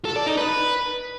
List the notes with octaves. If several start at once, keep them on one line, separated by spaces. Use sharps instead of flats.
A4
D5
D#4
B4